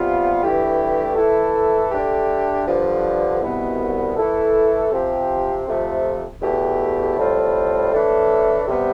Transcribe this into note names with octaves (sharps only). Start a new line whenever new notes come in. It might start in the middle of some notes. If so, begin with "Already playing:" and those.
Already playing: C3 G3 B3 F4
G2 E3 A3 E4 G4
E3 A3 E4 A4
D3 A3 D4 G4
G2 D3 F3
C2 B2 B3
E3 A3 E4 A4
C3 F3 C4 G4
F2 C3 F3 A3
E2 B2 A3 E4 G4
A2 G3 C4 F4 A4
A2 E3 A3 D4 A4
C3 G3 B3